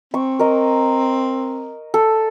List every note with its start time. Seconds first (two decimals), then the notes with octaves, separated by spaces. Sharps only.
0.14 C4 C#6
0.39 A#4 D#5
1.94 A4